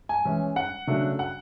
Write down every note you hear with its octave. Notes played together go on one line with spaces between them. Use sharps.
G#5
E3 G#3 C#4
F#5
C#3 F#3 A3 D4
F#5